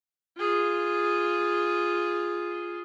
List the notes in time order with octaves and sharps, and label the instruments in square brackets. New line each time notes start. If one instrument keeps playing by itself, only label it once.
[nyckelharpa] F4 G#4